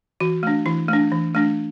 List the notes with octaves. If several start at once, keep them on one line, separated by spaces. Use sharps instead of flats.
E3 F#4
A3 D4
E3 E4
A3 D4
E3
A3 D4